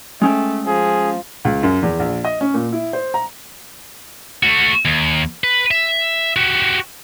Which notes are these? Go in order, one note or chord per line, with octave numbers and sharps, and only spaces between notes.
G#3 A3 C#4 G5
F3 G#4
C#2
F#2
E2
A#1
D#5
C#4
A#2
E4
C5
A#5
A3 F#4
D#2
B4
E5
F#4 G4